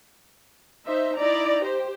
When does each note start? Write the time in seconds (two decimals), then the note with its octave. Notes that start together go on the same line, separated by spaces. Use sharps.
0.86 D#4 C5 E5
1.17 D#4 E4 D5 A#5
1.60 G4 C5